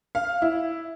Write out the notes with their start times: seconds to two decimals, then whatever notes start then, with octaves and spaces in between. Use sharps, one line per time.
0.15 F5
0.42 E4